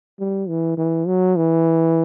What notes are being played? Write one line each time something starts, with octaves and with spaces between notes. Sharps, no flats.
G3
E3
E3
F#3
E3